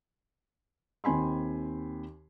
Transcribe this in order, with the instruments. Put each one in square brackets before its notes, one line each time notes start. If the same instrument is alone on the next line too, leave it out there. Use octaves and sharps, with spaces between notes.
[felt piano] D#2 C4 G#5 B5 C6